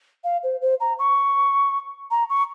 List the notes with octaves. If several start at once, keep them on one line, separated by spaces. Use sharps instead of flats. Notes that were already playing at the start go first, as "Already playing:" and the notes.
F5
C5
C5
A#5
C#6
A#5
C#6